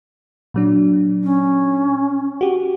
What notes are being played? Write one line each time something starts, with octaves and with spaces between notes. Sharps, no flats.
A#2 F#3 D4
C#4
F#4 G4